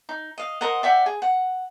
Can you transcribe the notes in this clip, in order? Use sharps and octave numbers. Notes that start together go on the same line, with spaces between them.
D#4
D#5 F5
A#4 C5 D#5 F#5
D5 E5 F#5 G5
G#4
F#5